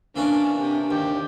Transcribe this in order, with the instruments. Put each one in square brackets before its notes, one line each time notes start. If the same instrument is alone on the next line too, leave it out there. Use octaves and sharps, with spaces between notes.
[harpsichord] E3 A#3 C#4 [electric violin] D4
[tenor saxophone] C3 [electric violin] D4
[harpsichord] D#2 [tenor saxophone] G4